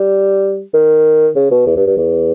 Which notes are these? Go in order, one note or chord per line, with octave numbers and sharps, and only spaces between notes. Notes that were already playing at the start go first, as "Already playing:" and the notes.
Already playing: G3
D#3
C#3
B2
E2
G2
G2
E2